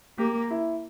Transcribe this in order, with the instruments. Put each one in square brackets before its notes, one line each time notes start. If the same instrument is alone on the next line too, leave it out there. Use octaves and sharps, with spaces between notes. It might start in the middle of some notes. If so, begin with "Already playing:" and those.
[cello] A#3 [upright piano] G4
[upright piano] E4